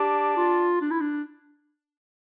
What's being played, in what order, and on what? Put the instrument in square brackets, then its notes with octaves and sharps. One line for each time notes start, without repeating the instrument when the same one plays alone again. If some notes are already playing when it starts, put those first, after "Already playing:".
Already playing: [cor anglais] D4 [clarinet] G4
[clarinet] F4
D4
E4
D4